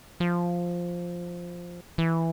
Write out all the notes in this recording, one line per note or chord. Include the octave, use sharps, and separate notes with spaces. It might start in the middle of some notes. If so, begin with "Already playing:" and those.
F3
E3